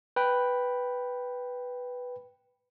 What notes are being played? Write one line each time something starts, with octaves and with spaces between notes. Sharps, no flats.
B4 G5 B5